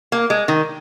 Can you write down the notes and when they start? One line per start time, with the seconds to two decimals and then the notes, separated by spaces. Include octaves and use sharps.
0.12 A#3
0.30 G#3
0.48 D#3